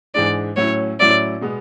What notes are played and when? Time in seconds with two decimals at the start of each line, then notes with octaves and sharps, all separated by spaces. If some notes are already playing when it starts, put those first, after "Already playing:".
0.15 G#2 E3 G#3 D4 D5
0.57 A2 F#3 C#4 E4 C#5
1.00 A2 F#3 C#4 E4 D5
1.41 B2 G#3 B3